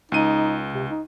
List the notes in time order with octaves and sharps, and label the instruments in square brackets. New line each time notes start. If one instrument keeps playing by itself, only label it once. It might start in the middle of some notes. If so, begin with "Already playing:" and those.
[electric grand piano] C#2 D#7 [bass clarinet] D#4
[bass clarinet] C3
D#4